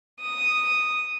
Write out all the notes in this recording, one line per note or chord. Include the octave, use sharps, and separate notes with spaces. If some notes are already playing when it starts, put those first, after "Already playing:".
D#6